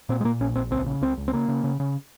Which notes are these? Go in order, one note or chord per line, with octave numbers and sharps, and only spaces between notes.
A#2 C4
G#3
A#2 A#3
A#1 C#4
A#1 C4
C#2 C4
C#3
C#2 C4
C#2
C4
C#3 A#3
C#3
C#3
C#3